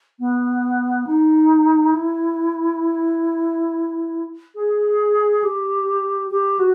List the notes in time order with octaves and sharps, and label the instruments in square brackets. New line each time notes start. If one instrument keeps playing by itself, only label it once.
[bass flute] B3
D#4
E4
G#4
G4
G4
F#4